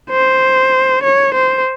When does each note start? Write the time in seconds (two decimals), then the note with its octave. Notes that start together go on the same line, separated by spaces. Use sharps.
0.10 C5
1.03 C#5
1.34 C5